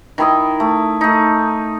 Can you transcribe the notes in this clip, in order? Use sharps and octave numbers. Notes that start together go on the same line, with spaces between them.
D#3 E4 D#5
A3
A3 D#4